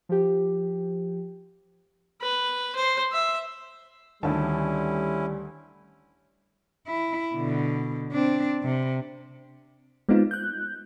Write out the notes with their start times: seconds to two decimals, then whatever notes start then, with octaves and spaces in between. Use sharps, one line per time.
0.09 F3 G4
2.22 B4
2.76 C5
3.12 E5
4.23 D2 D#3 G3 C#4 E4 A5
6.87 E4
7.35 B2 D3
8.12 C4 D4
8.64 C3
10.09 G#3 B3 C4 D#4 F4
10.31 F#6 G6